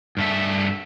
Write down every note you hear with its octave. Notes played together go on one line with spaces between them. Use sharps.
G2 A3 E5